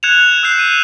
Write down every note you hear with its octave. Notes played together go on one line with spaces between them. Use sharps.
F#6 G#6 C#7 E7 F7
E6 F#6 G6 C7 E7
D#7